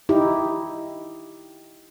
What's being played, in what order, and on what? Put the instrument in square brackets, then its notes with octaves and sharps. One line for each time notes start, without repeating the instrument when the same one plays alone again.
[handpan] D#4 E4 G4